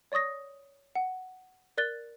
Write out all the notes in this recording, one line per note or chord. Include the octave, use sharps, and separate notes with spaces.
C#5 D5 C#6 D#6 A#6
F#5
A#4 D5 F#6 A6 G7